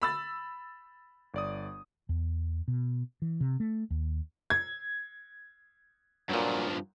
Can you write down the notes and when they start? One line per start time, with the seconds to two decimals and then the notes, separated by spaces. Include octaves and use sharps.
0.02 B5 E6 A6
1.34 G1 D5 D#6
2.09 E2
2.68 B2
3.22 E3
3.41 C3
3.60 A3
3.90 D#2
4.50 G#6
6.30 G2 A#2 F3 F#3